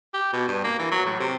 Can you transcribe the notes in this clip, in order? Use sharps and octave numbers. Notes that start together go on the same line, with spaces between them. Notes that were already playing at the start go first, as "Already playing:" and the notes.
G4
B2
G2
A#3
E3
F#3
A2
C3